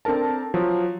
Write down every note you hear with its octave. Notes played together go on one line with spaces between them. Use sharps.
C4 D4 A4 A#4 A5
F3 F#3